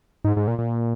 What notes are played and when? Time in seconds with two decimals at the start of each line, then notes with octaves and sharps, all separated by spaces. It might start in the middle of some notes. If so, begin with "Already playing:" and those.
0.24 G#2
0.37 G#2
0.48 A#2
0.59 A#2